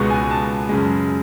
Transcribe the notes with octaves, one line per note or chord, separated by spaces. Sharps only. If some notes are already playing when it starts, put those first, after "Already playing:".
Already playing: C#2 B2 G#3 B3 C#6
G#5
A5
F#2 C#3 G#3